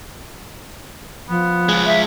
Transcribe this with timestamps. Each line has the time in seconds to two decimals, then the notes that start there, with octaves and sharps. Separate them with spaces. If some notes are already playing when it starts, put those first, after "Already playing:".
1.29 F3 B3
1.69 G#3 F4
1.86 E5